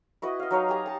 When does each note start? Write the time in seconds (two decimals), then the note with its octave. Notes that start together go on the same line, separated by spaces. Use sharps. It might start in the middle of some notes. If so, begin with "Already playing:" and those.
0.22 E4 F#4 B4 D#5
0.39 D#5 F5
0.51 F#3 D#4 C#5 F5
0.68 G4 G#5 A#5
0.86 A5 A#5